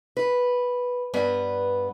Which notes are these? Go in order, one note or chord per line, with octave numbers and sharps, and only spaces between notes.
B4
G2 B3 B4